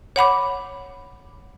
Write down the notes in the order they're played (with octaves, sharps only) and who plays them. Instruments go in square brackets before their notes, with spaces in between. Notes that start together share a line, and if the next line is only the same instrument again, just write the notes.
[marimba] C#5 F#5 B5 D6